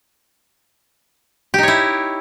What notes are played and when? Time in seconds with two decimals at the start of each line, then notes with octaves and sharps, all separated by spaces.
1.54 G4
1.58 D#4
1.63 C#5
1.68 E4